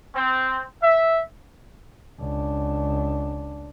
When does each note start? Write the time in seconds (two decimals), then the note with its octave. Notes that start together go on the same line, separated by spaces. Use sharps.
0.15 C4
0.81 E5
2.19 C#2 D4